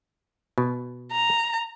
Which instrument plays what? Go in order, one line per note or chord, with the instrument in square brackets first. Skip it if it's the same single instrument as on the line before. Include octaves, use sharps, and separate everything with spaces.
[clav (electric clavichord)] B2
[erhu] A#5